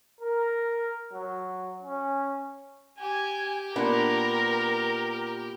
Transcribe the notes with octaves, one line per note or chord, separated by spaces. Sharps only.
A#4
F#3
C#4
G4 G#5
A#2 B3 D4 A#4